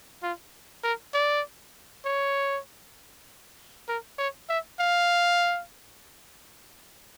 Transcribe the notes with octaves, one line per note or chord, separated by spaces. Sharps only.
F4
A#4
D5
C#5
A#4
C#5
E5
F5